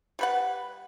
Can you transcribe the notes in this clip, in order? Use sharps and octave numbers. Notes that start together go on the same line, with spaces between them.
G3 B4 F#5